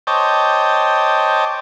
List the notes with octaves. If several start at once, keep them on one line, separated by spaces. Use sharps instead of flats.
C5 C#5 D#5 G5 A5 D6